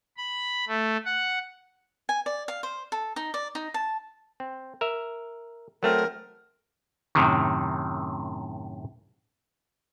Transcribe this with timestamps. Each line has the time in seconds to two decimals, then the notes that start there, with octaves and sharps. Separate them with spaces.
0.17 B5
0.68 A3
1.05 F#5
2.09 G#5
2.26 D5
2.48 F5
2.63 C5
2.92 A4
3.16 D#4
3.34 D5
3.55 D#4
3.74 A5
4.40 C4
4.81 A#4 E5
5.83 F#3 A3 C4 A#4
7.15 F#2 A2 C3 D#3